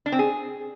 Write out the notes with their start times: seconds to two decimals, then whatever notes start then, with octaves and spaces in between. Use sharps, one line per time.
0.06 D4
0.12 C4
0.19 G#4